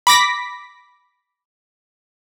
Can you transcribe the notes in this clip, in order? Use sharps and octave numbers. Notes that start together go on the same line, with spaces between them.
B5 D6 A#6 B6